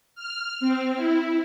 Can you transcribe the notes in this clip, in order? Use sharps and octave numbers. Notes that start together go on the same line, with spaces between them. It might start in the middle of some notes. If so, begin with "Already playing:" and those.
F6
C4
E4